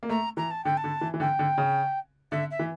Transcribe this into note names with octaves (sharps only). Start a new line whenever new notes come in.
A#3
A3 A#5
E3 A#5
A5
D3 G5
A5
D3
E3
E3
D3 G5
D3
C#3
D3 E5
E5
E3